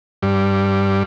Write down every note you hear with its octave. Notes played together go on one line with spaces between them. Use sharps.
G2